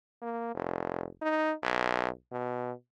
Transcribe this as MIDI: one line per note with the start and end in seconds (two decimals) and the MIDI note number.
0.22 0.53 58
0.54 1.07 29
1.22 1.53 63
1.63 2.08 35
2.32 2.72 47